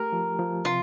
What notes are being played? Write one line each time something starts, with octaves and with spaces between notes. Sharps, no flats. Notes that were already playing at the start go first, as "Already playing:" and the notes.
Already playing: A3 G4 A#4
F3
F3
C3 F4